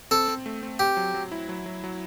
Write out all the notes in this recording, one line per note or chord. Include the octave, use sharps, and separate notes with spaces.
C4 A4
C4
A3
C4
C4 G4
F#3
F#3
E4
F#3
F#3
F#3